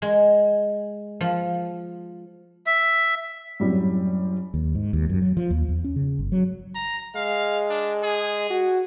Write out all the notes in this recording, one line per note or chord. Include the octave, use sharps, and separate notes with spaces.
G#3
F3
E5
F#2 A2 G3 C4
D#2
G#2
D#2
F#2
F#3
F3
D#2
E2
C#4
C#3
G1
F#3
A#5
G#3 F5
D4
G#4
F#4